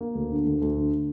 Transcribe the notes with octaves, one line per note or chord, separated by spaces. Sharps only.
A#3
D2
D3
D2
D2
D3